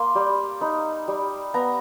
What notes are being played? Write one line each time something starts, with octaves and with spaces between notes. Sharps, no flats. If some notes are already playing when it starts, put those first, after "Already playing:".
Already playing: A#3 C6
G3
D#4 B5
G3
B3 A#5